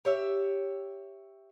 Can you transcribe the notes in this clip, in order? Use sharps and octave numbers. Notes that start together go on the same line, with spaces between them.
G4 C#5 E5